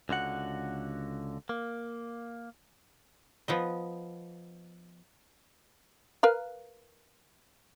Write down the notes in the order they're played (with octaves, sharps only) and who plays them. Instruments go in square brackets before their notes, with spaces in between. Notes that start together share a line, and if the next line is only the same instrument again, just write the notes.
[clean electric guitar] C#2 D3 F#4 F#5
A#3
[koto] F3 B3 D#5
[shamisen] A#4 B4 F5